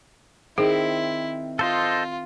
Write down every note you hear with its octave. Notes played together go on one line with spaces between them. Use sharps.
D#3 C4 E4 G#4
F4 A4 C5 D#5